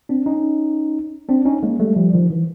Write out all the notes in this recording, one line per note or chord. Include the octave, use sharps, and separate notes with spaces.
C4 D4
C#4 D#4
C4 D4
C#4 D#4
G#3 A#3
G3 A3
F3 G3
D#3 F3
E3